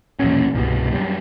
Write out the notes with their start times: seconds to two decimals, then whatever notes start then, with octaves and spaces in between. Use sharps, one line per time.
0.19 E1 A#1 F#2 C#4
0.55 C2 G2 B2
0.92 F#2 G3